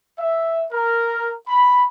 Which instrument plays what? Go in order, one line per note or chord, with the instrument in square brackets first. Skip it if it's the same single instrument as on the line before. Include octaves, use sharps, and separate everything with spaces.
[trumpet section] E5
A#4
B5